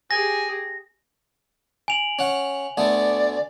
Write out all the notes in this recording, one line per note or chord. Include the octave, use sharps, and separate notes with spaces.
G4 G#4 G#5 A#6
G#5 F7 F#7
C#4 F#5
D2 A3 B3 D5